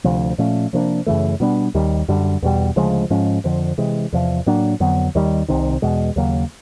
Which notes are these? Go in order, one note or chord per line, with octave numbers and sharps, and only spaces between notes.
D2 C3 F3
A#2 F3 A3 C#4
C3 F3 A#3 D4
F#2 C#3 E3 A3
B2 G3 B3 D4
D#2 D#3 G3
F#2 D3 G3
E2 B2 G3
D2 C#3 F3 G#3
G#2 F3 G#3 C#4
F2 D3 F3
C3 E3 G#3
E2 C3 F3
A2 F#3 A#3 D4
F2 D3 F#3 B3
D#2 D#3 G3
C2 C3 D#3
E2 B2 G#3
D#2 C#3 F#3 A#3